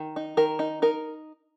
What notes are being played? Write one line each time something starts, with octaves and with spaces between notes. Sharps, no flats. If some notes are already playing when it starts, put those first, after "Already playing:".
Already playing: D#3
D#4
D#3 A#4
D#4
D#4 A#4